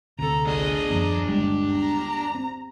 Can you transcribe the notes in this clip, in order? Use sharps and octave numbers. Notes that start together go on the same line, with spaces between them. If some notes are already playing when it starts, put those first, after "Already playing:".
D2 C3 A4 A#5
A1 D4 G#4 D#5 G#5
D#1 F#2 F3 A#5
G1 D#2 G3 G#3 G4
A#5
C4